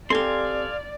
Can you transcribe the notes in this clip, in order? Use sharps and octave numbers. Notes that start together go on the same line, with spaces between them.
C4 G4 A4 D5 F5 G#5 C6